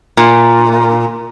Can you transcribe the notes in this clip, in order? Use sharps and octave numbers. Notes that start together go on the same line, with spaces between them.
A#2